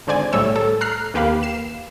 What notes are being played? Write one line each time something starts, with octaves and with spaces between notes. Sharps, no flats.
G#1 D3 C5 D5 G#5 G#6
B1 A2 G3 A3 C#5 E6
A4
A#5 F6 F#6 C7
D#2 A#3 G4 B4 F5 B5
C7 E7